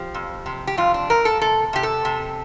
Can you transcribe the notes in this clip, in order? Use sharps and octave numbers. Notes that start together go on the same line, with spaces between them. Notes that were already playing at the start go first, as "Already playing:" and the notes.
Already playing: F3 G4
F2
C3
G4
F2 F4
D4
F2 A#4
A4
C3 A4
C3 G4
A4
C3